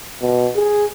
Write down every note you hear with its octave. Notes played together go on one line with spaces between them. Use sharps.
B2
G#4